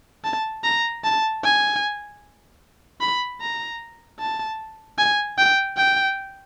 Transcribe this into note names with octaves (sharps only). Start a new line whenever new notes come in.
A5
A#5
A5
G#5
B5
A#5
A5
G#5
G5
G5